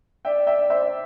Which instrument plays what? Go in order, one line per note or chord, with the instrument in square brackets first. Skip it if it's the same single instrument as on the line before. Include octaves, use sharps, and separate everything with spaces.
[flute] D5 [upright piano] E5 G5
[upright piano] E5 G5
C5 E5